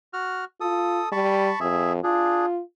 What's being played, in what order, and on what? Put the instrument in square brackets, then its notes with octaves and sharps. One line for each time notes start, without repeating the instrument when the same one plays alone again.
[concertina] F#4 F6
[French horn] F4 [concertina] A4 D#6
[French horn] G3 [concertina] A5 B5 C#6
[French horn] F2 [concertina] G#4 E5
[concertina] D4 G#4 [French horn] F4